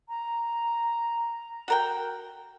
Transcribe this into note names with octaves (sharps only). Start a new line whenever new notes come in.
A#5
F#4 A#4 G5